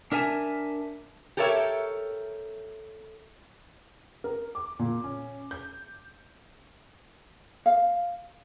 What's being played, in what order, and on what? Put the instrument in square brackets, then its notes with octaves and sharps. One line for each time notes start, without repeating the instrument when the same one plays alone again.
[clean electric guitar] D4 A#4 E5 G#5 A5
[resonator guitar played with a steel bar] G4 A4 A#4 C#5 E5
[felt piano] A#4
D6
A#2
C#4
G6
[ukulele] F5